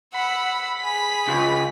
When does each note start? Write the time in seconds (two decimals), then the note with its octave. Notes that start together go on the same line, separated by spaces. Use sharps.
0.14 F#5 B5 E6
0.82 G#4 B6
1.28 C#2